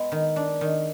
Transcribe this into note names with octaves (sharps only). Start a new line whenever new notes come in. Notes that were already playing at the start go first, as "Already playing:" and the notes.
Already playing: G#3 B3
D#3
D4
D#3